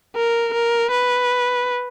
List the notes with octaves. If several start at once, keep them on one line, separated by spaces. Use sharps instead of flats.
A#4
A#4
B4